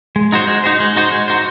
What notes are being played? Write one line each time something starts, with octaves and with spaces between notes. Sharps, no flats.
G#3
D#4 F#4 C5
G#3
D#4 F#4 C5
G#3
D#4 F#4 C5
G#3
D#4 F#4 C5